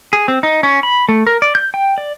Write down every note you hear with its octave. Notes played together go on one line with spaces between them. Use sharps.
G#4
C4
D#4
C#4
B5
A3
A#4
D5
G6
G5
D5